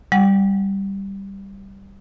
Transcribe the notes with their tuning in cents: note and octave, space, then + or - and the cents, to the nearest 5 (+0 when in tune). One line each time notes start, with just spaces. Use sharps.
G3 +0 F#5 +0